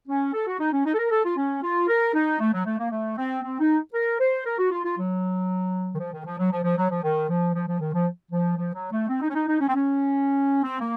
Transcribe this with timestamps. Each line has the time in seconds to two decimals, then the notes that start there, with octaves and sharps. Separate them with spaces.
0.08 C#4
0.33 A4
0.46 F#4
0.59 D#4
0.72 C#4
0.85 D#4
0.94 A4
0.98 A#4
1.11 A4
1.24 F4
1.37 C#4
1.63 F4
1.88 A#4
2.14 D#4
2.40 A3
2.52 F#3
2.66 A3
2.78 A#3
2.91 A3
3.17 C4
3.43 C4
3.60 D#4
3.94 A#4
4.19 C5
4.46 A#4
4.58 F#4
4.71 F4
4.84 F4
4.97 F#3
5.94 D#3
5.99 F3
6.13 D#3
6.26 F3
6.39 F#3
6.51 F3
6.64 F3
6.77 F#3
6.90 F3
7.03 D#3
7.29 F3
7.54 F3
7.67 F3
7.80 D#3
7.93 F3
8.31 F3
8.57 F3
8.74 F#3
8.91 A3
9.09 C4
9.21 D#4
9.29 C#4
9.34 D#4
9.47 D#4
9.60 C#4
9.68 C4
9.75 C#4
10.63 C4
10.80 A#3